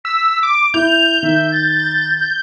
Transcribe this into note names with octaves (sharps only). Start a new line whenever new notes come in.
E6 B6
D6 D7
E4 G6 F7
D#3 E5
A6